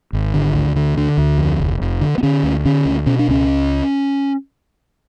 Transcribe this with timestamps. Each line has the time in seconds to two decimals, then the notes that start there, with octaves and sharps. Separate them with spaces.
0.13 G#1
0.34 D3
0.54 D2
0.76 D3
0.97 D3
1.17 D2
1.38 F2
1.59 F1
1.81 F1
2.01 D3
2.18 B3
2.23 D3 C#4
2.43 D2
2.65 D3 C#4
2.85 D2
3.06 B2 C#4
3.19 D4
3.28 C#2 C#4